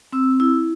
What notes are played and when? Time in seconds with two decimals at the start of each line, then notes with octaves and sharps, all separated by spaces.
0.13 C4 E6
0.40 E4 E6